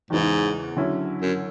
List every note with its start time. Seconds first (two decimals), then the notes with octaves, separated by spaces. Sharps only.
0.10 E2 G#2 C#3 E3
0.77 D3 F#3 C#4 E4
1.22 F#2